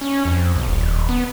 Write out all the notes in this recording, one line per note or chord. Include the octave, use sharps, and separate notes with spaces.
C#4
F2
B1
D#1
B3